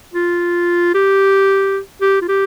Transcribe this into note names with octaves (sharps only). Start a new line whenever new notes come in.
F4
G4
G4
F4
G4